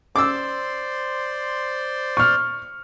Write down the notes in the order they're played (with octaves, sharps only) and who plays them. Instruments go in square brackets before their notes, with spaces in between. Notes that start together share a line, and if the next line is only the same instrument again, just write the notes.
[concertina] C5 D5 C6 [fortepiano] D6 E6
[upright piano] C#6 F6